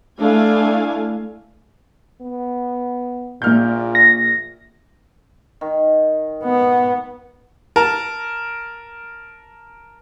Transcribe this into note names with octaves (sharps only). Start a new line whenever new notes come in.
A3 D4 E4 F5 G#5
B3
A#1 A#2 F6 G6
A#6
D#3
B3
A#4 A5